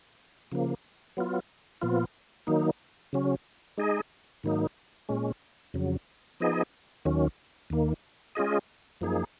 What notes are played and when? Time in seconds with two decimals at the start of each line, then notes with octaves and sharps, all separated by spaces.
0.52 C#3 F3 A#3
1.17 F#3 B3 F4
1.81 A#2 F3 B3 F4
2.47 D#3 F#3 A#3 D#4
3.13 C#3 F#3 C#4
3.78 G#3 D#4 G#4 D#5
4.43 G#2 D#3 F#3 A#3 D#4
5.09 A#2 G#3 C#4
5.74 F2 C#3 F#3
6.40 F3 B3 D#4 G#4 D#5
7.05 D#2 D#3 F#3 C#4
7.70 D#2 D#3 A#3
8.35 G#3 C#4 F4 G#4 D#5
9.01 F#2 F3 A#3 D#4 G#4